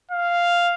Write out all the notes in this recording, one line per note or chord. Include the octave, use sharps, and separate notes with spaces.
F5